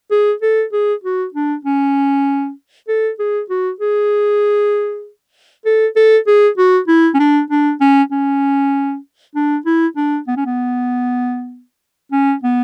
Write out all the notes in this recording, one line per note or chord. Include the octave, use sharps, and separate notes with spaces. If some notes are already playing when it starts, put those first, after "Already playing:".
G#4
A4
G#4
F#4
D4
C#4
A4
G#4
F#4
G#4
A4
A4
G#4
F#4
E4
C#4
D4
D4
C#4
C#4
D4
E4
D4
B3
C#4
B3
C#4
B3